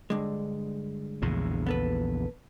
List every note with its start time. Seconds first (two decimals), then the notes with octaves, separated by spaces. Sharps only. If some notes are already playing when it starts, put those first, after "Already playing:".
0.10 G2 D3 G#3
1.22 A#1 E2 C#3
1.66 B3 A4 B4